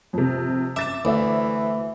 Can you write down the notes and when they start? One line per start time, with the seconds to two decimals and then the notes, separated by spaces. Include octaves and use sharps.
0.13 F2 C3
0.76 E5 D6 A6 E7
1.05 D2 E3 C5 E5